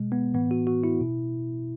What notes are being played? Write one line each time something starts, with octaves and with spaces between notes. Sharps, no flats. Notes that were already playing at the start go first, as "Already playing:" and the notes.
Already playing: B2 G#3
B3
A2 E3 B3
F#4
F#4
E4
B2